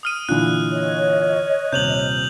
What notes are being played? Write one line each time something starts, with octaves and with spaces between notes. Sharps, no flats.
D#6 F6 D#7
A#2 D3 E3 F#6
C#5 D#5
D#1 C3 G6 F7 F#7